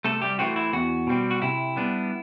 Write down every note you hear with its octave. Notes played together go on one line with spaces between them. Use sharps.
C3 A3 A4
G3 G4
E3 A3 C4 F#4
E4
E2 F#4
B2 G3 C4
F#4
C3 E4
G3 B3 D4